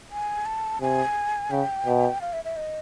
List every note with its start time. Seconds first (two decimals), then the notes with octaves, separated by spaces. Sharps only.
0.11 G#5
0.46 A5
0.81 C3 G#5
1.51 C#3 G5
1.86 B2
2.21 F5
2.33 E5
2.45 E5
2.56 D#5